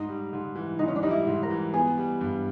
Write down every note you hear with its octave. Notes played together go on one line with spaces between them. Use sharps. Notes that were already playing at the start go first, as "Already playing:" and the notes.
Already playing: G#2 D#4
G3
G#2
E3
G#2 D#4
C#4
D4
G3 D#4
E4
G#2
A#4
E3
B3 G#4
G3
G2